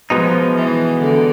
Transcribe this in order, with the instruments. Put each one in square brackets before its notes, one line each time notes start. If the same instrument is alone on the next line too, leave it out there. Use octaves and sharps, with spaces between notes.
[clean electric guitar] B2 G#3 B3 D#4 [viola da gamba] F3
[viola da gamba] E3
D3